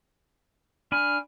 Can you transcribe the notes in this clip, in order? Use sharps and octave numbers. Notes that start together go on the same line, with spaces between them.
D4 G#5 B5 F6